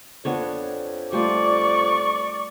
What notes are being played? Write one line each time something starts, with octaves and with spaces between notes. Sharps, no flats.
F2 B3 D4 C#5
G3 A3 F4 D5 C#6